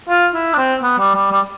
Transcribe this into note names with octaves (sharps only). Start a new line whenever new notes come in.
F4
E4
D4
C4
B3
G3
G3
G3